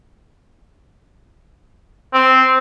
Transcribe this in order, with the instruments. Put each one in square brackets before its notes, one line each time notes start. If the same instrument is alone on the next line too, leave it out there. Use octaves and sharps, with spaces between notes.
[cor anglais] C4